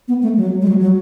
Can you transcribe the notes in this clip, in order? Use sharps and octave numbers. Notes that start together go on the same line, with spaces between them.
B3
A3
F#3
G#3
F#3
F#3